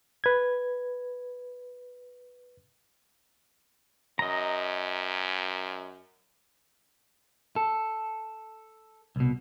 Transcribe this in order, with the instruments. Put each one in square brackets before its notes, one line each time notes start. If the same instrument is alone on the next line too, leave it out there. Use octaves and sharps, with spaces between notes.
[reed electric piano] B4 G#6
[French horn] F#2 [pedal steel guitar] D#5 A#5
[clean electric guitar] A4
C2 B2